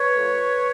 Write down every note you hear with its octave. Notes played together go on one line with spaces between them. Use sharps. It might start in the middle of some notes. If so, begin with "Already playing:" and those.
Already playing: B4 C#5
F3 A3